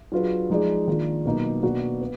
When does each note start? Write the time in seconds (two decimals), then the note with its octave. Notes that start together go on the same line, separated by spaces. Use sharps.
0.12 F#3 D4 F4 G#4 B4
0.50 F3 G#3 D#4 G#4 D5
0.87 D#3 A#3 D4 F4
1.25 B2 F#3 A#3 D#4
1.63 B2 A#3 D4 F#4 B4
2.01 B3